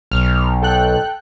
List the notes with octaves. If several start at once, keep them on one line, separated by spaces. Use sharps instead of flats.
B1 F6
A4 G5 F#6